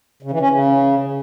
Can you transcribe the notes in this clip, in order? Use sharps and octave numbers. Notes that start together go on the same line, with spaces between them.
C#3
E3
C#4
C#3